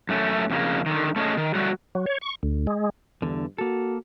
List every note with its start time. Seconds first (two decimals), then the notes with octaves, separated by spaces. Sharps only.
0.09 F#2 A3 C#4
0.50 F2 C#3 A#3
0.86 D3 D#3
1.16 A3 C#4 G#4 D#5
1.37 D#3
1.55 F#3 G3 A3 F#4
1.95 F#3
2.06 C#5
2.21 C#6
2.43 D2
2.67 G#3
3.22 E2 G2 D3
3.58 A#3 F#4 A4